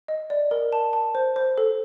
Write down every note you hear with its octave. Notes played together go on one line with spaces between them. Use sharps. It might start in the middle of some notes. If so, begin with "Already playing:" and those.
D#5
D5
A#4
A5
A5
C5
C5
A4